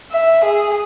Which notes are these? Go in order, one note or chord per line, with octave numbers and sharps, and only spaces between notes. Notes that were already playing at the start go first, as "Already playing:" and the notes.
E5
G#4